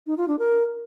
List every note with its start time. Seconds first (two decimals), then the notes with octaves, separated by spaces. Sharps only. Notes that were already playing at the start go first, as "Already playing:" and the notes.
0.07 D#4
0.17 F4
0.28 D4
0.39 A#4